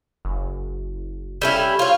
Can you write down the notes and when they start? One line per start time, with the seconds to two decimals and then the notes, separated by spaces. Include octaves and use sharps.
0.25 F#1
1.42 G3 C#4 E4 A4
1.79 F4 C#5